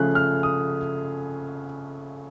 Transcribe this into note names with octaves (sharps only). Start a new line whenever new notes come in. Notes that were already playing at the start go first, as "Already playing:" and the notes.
Already playing: C#3 F3 A3 C#4 F#6
F6
D#6